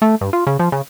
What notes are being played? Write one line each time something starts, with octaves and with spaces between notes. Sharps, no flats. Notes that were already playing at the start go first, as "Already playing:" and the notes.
A3
G2
F4
C#3
F3
C#3